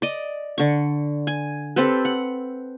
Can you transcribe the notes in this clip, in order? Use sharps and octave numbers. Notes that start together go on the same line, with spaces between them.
D5 D#5
D3 C#6
G#5
C4 G4 A4 B4
F#5